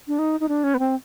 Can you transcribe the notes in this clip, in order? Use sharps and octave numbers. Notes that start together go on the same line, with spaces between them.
D4
D#4
D#4
D4
C#4
B3
C4